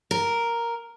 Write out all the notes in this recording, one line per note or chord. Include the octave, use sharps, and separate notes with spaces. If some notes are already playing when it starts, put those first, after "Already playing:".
A#4